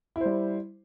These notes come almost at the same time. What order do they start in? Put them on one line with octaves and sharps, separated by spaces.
E4 C5 G3